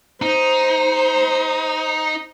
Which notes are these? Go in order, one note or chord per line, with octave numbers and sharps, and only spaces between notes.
D#4 C5